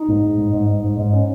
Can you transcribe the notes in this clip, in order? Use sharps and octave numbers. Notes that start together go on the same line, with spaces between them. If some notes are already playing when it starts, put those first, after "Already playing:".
Already playing: D#4
G#2
G#2
G#2
G#2
G#2
G#2
G#2
C#4